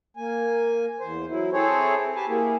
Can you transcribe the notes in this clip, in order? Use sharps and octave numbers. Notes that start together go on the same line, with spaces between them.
A#3 G#5
E2 C5
F#3 E4
C4 E4 G#4 A4 C5 C#5
G4 B4 G#5 A5
A#3 E4 G4 G#4